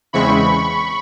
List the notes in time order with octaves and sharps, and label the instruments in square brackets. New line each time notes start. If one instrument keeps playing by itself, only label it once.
[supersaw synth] E2 C#3 E3 G#3 C4 B5 C#6